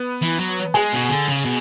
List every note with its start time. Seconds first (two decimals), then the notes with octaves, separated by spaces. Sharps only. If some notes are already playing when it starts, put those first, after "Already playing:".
Already playing: B3
0.22 E3
0.39 F#3
0.74 G#3 G#4
0.93 B2
1.10 D3
1.28 C#3
1.45 B2